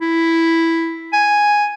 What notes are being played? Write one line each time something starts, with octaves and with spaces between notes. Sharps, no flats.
E4
G#5